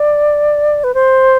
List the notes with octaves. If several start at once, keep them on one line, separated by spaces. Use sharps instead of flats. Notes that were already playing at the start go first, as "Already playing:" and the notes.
Already playing: D5
B4
C5